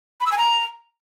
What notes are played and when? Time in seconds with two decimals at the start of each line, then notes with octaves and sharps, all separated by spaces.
0.21 B5
0.26 E6
0.32 G#5
0.38 A#5